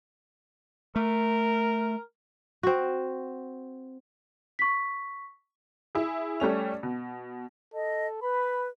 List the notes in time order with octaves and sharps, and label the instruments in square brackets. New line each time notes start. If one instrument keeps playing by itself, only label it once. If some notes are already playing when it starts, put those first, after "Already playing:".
[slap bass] A3 [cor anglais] A#4
[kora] C4 F#4
[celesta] C#6 B6
[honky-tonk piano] E4 G#4
G3 A3 C#4 F7
B2
[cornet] A4 [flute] D#5
[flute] B4 [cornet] B5